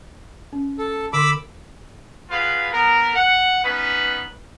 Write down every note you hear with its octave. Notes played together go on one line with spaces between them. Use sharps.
C#4
A4
D3 A#4 B5 C6 D6 E6
F4 F#4 G#4 B4 F5
B3 A#4
F#5
B3 C#4 D#4 B4